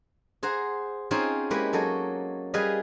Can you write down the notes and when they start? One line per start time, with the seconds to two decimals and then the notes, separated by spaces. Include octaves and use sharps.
0.43 G#4 C5 F#5 A#5
1.11 C4 C#4 D#4 F4 G#4 C5
1.50 G#3 A#3 E4 G4 B4
1.73 F#3 A#3 A4 C#5 D#5
2.54 G3 G#4 B4 D#5 F5